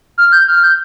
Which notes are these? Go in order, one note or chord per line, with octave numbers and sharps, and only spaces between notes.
F6
G6
F6
G6